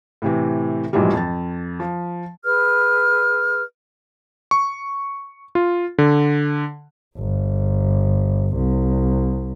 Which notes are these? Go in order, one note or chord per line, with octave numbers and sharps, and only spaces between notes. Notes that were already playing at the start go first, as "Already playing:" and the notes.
A2 C3 E3
A#1 G#2 B2 E3 F#3 G3
F2 A6
F3
G#4 B4 F6
C#6
F4
D3
G1
C2